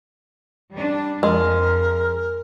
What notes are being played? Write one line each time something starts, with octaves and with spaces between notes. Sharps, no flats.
G3 D4
F2 G#3 A#4